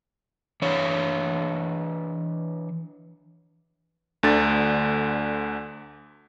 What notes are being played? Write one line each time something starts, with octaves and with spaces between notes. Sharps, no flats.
E3 D4 C#5
D2 D3 A6